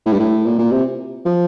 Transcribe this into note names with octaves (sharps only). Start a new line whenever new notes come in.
A2
G2
A2
A#2
A#2
C3
F3